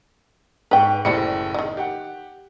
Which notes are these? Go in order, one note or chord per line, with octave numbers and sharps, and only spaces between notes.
G#2 B4 G5 C#6
F#1 A2 E3 G3 C5 C#7
D3 D#3
G4 F#5